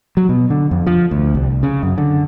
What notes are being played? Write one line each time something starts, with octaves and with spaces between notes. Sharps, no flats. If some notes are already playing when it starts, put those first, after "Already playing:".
F#3
B2
D3
F2
F3
D2
C2
C#3
F#2
D3